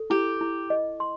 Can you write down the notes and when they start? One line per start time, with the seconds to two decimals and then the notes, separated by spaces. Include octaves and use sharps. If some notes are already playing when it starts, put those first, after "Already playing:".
Already playing: A4
0.10 E4 G4
0.41 E4
0.70 D#5
1.00 C6